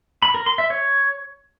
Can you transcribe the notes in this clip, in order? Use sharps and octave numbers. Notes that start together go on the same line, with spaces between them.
B5
A#4
C6
E5
C#5